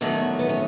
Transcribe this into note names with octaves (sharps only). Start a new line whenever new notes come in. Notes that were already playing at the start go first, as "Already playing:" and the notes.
E2 D#3 F#3 A3 C#4
B3
C#4